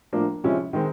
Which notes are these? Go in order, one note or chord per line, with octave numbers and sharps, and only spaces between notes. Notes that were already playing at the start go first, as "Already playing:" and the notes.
A2 F3 A#3 D4
C3 F3 G#3 C#4 E4
D#3 G#3 C4